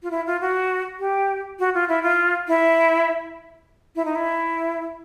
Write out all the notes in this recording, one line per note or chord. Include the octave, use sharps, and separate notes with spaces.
F4
E4
F4
F#4
G4
F#4
F4
E4
F4
E4
E4
D#4
E4